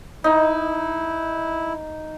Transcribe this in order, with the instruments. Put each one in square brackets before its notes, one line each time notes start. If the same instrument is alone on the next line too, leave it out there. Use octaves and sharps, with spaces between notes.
[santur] D#4 [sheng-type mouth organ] E4